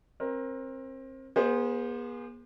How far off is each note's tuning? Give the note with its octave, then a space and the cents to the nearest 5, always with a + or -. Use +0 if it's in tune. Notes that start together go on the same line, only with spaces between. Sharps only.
C4 +30 A#4 +20
B3 -45 G#4 -15 C5 +0